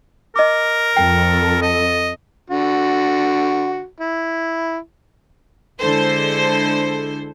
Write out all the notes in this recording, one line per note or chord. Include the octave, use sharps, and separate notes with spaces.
A#4 D#5 D6
F2 A4 G5
D#5
D3 F#4
E4
D3 G#3 E4 A4 C5